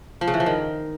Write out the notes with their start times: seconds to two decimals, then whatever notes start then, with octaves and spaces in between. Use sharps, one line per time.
0.21 F3
0.27 C#3
0.34 E3
0.40 F3
0.46 D#3